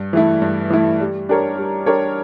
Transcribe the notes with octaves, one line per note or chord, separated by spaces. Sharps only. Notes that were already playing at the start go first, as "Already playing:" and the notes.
Already playing: G2
E3 A3 E4
G2
E3 A3 E4
G3
D4 G4 A#4 C#5
G3
D4 G4 A#4 C#5